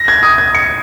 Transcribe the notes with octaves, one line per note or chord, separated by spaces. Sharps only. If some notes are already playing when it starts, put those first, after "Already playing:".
Already playing: A#6
G#6
D#6
G#6
C#7